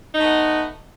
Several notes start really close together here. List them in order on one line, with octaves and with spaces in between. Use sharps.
D#4 A3 B3